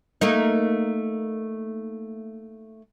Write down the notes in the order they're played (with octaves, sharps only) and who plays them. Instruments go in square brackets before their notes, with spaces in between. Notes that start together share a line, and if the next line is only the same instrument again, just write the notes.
[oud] A3 A#3 D#4